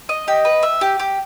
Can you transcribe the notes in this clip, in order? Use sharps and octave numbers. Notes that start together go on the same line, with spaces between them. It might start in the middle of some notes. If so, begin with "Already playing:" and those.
D#5
G4 D#5
B4
E5
G4
G4